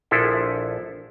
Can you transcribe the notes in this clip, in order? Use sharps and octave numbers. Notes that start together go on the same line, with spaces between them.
A#1 F3 D4 E4 G#4 A4